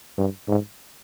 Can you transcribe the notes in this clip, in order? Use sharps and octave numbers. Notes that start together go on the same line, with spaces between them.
G2
G#2